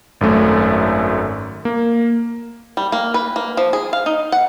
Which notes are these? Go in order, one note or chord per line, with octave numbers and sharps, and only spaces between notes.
G#1 F#2 A3
A#3
G3
A#3
B4
A#3
F3
G#4
F5
D#4
F#5